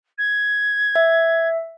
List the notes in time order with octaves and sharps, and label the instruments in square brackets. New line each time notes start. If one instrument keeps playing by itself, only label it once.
[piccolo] G#6
[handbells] E5